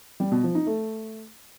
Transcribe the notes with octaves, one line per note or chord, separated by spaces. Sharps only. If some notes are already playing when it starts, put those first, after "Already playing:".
G3
B2
F3
D#4
A3